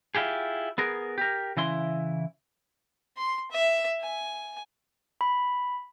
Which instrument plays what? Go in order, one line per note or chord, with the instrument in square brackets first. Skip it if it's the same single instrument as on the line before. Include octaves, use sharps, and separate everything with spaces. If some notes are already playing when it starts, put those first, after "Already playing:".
[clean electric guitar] E4 F4 G4 G#4
B3 G#4 A#4
G4 A#4
C#3 E3 E4 C6
[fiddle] C6
E5
G#5
[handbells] B5